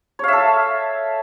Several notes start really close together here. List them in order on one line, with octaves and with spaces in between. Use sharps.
C#5 F5 E5 A4